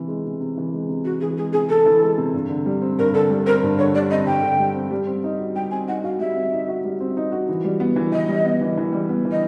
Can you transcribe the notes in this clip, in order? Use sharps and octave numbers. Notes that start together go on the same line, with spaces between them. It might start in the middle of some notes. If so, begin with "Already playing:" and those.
Already playing: C3 E3
G#3
C3
C3
E3
G#3
C3
C3 F#4
E3 G#4
G#3 G#4
C3 G#4
C3 A4
E3
G#3
C3
G2
D3
G3
C4
G2 A#4
D3 A4
G3
C4 A#4
G2
D3 C#5
G3 D5
C4 D#5
G2 G5
D3
G3
C4
G3
C4
D#4
F#4
G3 G5
C4 G#5
D#4 F#5
F#4 F5
G3 E5
C4
D#4
F#4
G3
C4
D#4
F#4
E3
G3
B3
E3
E3 D#5
G3
B3
E3
E3
G3
B3
E3
D#5